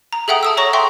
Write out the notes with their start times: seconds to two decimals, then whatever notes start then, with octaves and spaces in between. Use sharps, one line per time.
0.13 A#5
0.28 G#4 A4 E5 F#5 G5 D#6
0.43 A5 D#6 E6
0.57 G#4 C#5 A#5 C#6 A#6
0.73 E5 G5 C6 C#6